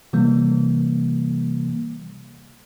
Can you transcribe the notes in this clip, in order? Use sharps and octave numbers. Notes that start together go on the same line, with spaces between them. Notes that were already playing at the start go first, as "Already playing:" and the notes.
C3 E3 G3 A#3